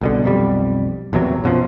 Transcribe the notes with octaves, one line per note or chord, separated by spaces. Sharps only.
C2 B2 D3
B1 F2 G3
A#1 E2 C3 F#3
F#2 B2 D3 F3